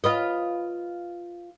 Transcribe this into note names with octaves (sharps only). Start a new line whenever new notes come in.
F4 B4 D#5